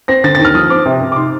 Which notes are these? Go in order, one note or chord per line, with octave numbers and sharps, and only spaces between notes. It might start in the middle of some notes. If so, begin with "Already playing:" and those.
C4 A#6
D3 A6
A6
D#2
F6
F3 D#6
C4 D6
C3
C3
D6
D#4 C6